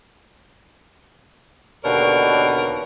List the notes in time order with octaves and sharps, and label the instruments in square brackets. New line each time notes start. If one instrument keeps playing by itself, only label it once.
[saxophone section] D#2 B2 D3 A#4 C#5 D5